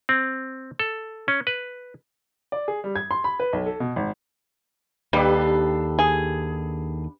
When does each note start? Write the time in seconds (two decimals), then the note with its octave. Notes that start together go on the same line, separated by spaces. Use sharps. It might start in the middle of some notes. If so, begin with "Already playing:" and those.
0.09 C4
0.79 A4
1.28 C#4
1.47 B4
2.52 D5
2.68 G#4
2.84 G3
2.96 G#6
3.11 C6
3.24 B5
3.40 B4
3.53 B1
3.66 A4
3.80 B2
3.96 G#1
5.13 D#2 G3 D4 G4 A4 B4
5.99 G#4